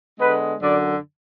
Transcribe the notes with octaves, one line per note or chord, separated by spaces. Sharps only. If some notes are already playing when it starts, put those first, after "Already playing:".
D3 G#3 B3 B4
F#2 D3 F#3 D5